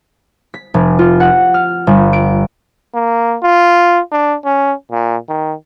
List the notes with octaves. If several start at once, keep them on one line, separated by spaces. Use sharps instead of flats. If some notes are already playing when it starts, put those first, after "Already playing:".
B6
F1
F4
F#5
F6
G1
D7
A#3
F4
D4
C#4
A#2
D#3